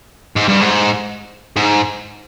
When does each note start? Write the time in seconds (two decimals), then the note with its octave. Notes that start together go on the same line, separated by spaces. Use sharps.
0.37 G#2
0.49 G2
0.61 G#2
1.56 G#2